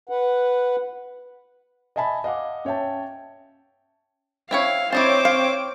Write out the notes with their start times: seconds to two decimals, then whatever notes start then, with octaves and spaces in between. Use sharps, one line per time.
0.09 B4 F#5
1.96 D#5 E5 G#5 A5 B5
2.24 D#5 F5 F#5 D6
2.65 C#4 C#5 E5 G5 A5
4.51 C4 E4 C#5 F5
4.93 C4 E4 C5 C#5 D#5 A5 D6 D7
5.25 F5